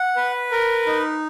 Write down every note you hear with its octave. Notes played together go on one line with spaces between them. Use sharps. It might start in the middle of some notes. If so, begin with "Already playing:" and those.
Already playing: F#5
B4
A#4
D#4